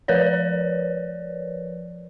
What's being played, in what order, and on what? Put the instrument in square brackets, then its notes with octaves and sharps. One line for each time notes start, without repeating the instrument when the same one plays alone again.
[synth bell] F3 A#4 B4 C#5 D5